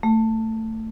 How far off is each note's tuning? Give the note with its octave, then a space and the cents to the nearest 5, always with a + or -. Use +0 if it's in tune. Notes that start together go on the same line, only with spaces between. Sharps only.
A3 +15